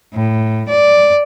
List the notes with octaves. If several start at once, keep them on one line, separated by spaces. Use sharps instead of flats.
A2
D5